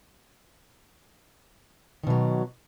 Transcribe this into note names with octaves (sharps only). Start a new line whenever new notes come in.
B2 D#3 F#3